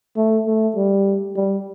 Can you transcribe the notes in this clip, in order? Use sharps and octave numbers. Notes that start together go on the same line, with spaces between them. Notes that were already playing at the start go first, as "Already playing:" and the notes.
A3
A3
G3
G3